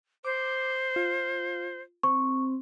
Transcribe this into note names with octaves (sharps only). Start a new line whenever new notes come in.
C5 D6
F4
C4 C#6